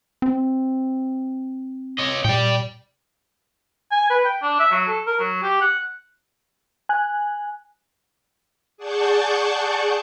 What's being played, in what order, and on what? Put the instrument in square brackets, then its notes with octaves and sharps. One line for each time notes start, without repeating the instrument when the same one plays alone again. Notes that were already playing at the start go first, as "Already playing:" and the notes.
[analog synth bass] C4
[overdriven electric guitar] C#5 D#5
[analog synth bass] A#2 [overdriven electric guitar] D5 G5
[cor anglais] G#5
B4
G5
D4
E5
F#3
A4
A#4
F#3
G4
F#5
[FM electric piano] G#5 F#6
[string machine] G#4 D5 F#5 A5 C#6 G6